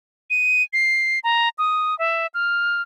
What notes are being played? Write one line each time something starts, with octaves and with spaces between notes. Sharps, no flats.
D#7
C7
A#5
D#6
E5
F6